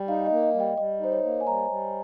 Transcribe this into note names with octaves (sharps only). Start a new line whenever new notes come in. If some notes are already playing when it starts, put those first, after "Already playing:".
Already playing: G3 G5
D#4 F5
D#5
A#3
D#5
G3
G5
G3 D#5
D#4 C5
C#5
A#3
G#5
G3 A#5
G3